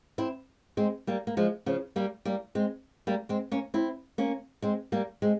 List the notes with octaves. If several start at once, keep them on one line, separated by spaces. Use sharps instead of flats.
C4 E4
G#3 C4
G3 A#3
A#3
F3 G#3
C#3 F3
G3 A#3
G3 A#3
G#3 C4
G3 A#3
G#3 C4
A#3 C#4
C4 E4
A#3 C#4
G#3 C4
G3 A#3
G#3 C4